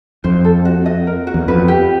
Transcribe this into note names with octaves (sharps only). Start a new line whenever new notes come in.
F2 C5
A4
F#4
D#5
A#4
F#4
E2
F2 B4
G4